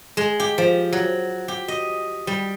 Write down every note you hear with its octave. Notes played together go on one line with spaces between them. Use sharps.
G#3
G4
F3
F#3
G4
D#5
G3